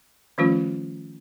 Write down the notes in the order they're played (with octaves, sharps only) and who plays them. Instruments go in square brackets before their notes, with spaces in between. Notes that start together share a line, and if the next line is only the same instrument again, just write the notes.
[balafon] D#3 F3 G3 A3 C#4 F4